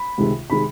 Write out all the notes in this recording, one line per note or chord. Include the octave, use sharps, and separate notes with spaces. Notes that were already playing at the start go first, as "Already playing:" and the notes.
Already playing: B5
C#2 C3 D#3 G#3
C3 D#3 G#3 B5